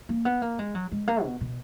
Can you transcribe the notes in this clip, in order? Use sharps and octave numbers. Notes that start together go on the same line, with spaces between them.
A#3
B3
A#3
G#3
F#3
G#3
A#3
B2
B2